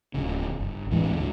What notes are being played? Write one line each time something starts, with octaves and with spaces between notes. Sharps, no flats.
D1 C#3
G1
D#2 A2 E3 G#3
D2 A2